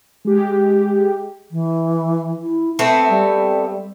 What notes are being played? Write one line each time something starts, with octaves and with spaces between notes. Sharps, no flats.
G#3 G4
E3
E4
A3 B3 C4 E5
G3